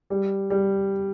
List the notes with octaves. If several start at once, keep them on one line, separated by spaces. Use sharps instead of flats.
G3
G3